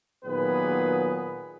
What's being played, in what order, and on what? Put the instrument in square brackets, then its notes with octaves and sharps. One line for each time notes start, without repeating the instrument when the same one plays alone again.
[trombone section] A#2 D#3 F#3 B3 G#4 B4